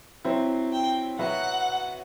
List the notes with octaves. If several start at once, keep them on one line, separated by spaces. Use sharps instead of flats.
F#3 C4 E4
G5
F#3 B3 F#4 B4 E5 F#5